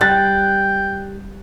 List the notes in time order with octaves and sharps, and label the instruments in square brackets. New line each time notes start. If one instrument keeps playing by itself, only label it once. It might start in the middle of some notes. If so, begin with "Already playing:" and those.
[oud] G3 [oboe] G5 [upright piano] F#6 A6